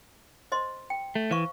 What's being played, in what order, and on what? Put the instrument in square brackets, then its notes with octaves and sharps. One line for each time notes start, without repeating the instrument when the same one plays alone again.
[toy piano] C5 D#5 C6
G5
[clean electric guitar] A3
[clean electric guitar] E3 [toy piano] C5 F5 C#6